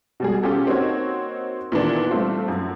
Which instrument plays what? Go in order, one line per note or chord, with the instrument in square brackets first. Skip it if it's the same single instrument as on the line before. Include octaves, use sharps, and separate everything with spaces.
[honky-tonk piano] B2 G3 G#4
C#4 F4 G4 A4
A#3 C4 D#4 F#4 C#5
A#2 D#3 E3 A#3 B3 D4
G3 A3 C4 F4
F#2